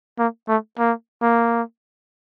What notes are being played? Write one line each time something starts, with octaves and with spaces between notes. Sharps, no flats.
A#3
A3
A#3
A#3